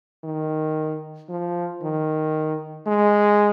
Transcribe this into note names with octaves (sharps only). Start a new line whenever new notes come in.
D#3
F3
D#3
G#3